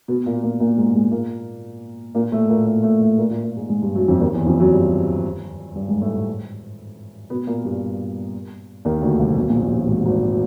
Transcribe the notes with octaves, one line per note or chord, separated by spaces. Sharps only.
B2 B3
A#2 A#3
A#2 A#3
A#2 A#3
G#2 G#3
G#2 G#3
A#2 A#3
A#2 A#3
A2 A3
A#2 A#3
A2 A3
A2 A3
A2 A3
A#2 A#3
A#2 A#3
A#2 A#3
G#2 G#3
G#2 G#3
G2 G3
F#2 F#3
F2 F3
D#2 D#3
E2 E3
F2 F3
F#2 F#3
G2 G3
G2 G3
G#2 G#3
A2 A3
B2 B3
A#2 A#3
G2 G3
D#2 D#3
D2 D3
C2 C3
B1 B2
A#1 A#2
A#1 A#2
A1 A2
G#1 G#2
G#1 G#2
A2